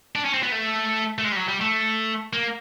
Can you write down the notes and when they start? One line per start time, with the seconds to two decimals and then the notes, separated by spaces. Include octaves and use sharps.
0.16 D4
0.25 C#4
0.33 C4
0.43 B3
0.52 A3
1.19 A3
1.24 G#3
1.32 G3
1.37 F#3
1.49 G3
1.61 A3
2.33 A#3